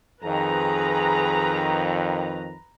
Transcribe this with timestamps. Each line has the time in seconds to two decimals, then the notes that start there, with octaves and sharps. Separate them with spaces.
0.23 F2 D#3 G#4 B4 A#5